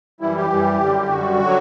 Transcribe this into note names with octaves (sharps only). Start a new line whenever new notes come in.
F#2 E3 G3 E4
G4
F#2 E3 G3
F#2 D3 G3
F#2 D3 G3 F#4
D3 F#3